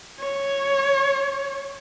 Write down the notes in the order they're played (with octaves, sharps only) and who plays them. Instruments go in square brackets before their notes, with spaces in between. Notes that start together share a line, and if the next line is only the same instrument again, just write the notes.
[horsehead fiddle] C#5